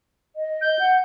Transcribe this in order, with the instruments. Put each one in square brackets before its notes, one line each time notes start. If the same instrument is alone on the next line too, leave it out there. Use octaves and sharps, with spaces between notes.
[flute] D#5
[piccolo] G6
[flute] F#5